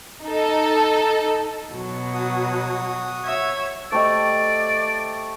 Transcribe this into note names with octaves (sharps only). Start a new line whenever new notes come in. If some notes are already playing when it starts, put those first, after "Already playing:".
D#4 A4
B2 F#3
F#4 D#6
C#5 E5 G#6
A3 G4 C5 D5 D#5